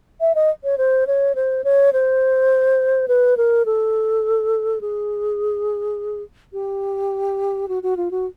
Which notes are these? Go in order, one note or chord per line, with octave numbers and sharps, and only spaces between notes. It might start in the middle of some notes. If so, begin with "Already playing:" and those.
E5
D#5
C#5
C5
C#5
C5
C#5
C5
B4
A#4
A4
G#4
G4
F#4
F#4
F4
F#4